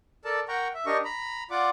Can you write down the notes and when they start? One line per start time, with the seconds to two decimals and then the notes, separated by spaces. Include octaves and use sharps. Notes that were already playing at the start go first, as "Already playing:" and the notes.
0.25 A4 A#4 D5 A5
0.48 A#4 F#5 G5 A#5 C#6
0.74 E5
0.86 D4 G4 A#4 D#5 C#6
1.04 A#5 B5
1.51 F4 D5 F#5 D6